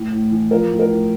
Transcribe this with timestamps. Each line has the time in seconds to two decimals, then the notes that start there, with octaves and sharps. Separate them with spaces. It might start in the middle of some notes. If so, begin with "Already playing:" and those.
Already playing: A2
0.13 A2
0.31 E3
0.51 F3 A#4
0.71 A2
0.79 A#4
0.90 A2